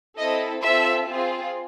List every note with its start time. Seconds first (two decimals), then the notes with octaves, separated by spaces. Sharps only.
0.17 C4 E4 A4 D#5
0.62 C4 F4 A4 E5
1.07 C4 F4 G#4